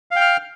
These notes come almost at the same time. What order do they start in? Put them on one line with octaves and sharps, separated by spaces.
F5 G5 F6